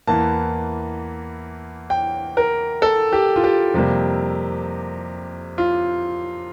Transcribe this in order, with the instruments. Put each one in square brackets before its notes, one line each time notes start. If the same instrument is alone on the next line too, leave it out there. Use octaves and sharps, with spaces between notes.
[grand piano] E2 E3 A#3 A5
G5
A#4
A4
G4
F4
G4
F2 C3 G3 A#3
F4